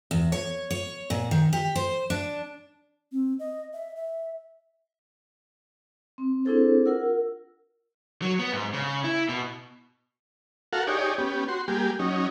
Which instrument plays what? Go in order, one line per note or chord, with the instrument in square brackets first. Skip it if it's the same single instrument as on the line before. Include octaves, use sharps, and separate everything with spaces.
[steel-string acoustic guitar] E2
C#5
C#5
A#2
D#3
G4
C5
D4
[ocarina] C4
D#5
E5
E5
[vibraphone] C4
C4 D4 E4 G#4 A4 C5
F4 A#4 F#5 E6
[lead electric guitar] F#3
B3
G#2
C#3
E4
B2
[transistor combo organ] F#4 A4 A#4 F5 F#5
D#4 G4 G#4 C#5 D5
B3 C#4 G4
F#4 C6
G3 A#3 G4 G#4
F#3 C#4 D#4